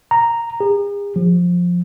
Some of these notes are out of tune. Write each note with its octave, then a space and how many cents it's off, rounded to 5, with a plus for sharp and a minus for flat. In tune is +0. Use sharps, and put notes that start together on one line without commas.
A#5 -5
G#4 -45
F3 +15